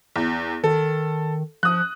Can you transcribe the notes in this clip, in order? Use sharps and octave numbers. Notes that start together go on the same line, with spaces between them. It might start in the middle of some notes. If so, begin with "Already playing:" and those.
E2
D#3 A4
F3 D#6 F#6